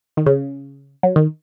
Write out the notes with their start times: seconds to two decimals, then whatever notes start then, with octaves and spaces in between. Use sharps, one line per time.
0.17 D#3
0.26 C#3
1.03 F#3
1.16 D#3